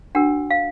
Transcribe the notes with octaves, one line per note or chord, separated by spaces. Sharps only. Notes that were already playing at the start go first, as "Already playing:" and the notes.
D4 F#4 A#4 F#5
F5